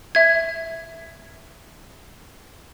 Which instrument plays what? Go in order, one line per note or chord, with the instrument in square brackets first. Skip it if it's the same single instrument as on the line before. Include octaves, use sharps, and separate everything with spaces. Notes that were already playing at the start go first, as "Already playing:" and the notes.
[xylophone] E5 G#6